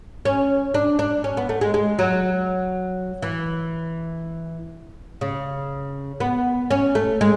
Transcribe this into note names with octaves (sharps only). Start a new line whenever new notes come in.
C#4
D4
D4
C#4
B3
A3
G#3
G#3
F#3
E3
C#3
B3
C#4
A3
G#3